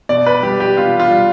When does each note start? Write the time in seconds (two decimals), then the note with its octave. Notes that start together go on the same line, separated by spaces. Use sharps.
0.09 B2 D5
0.26 B4
0.42 G3 G4
0.60 G4
0.77 B2 F4
1.00 F4
1.11 G3